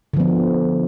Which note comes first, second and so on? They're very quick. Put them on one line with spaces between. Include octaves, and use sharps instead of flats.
D3 F3 B3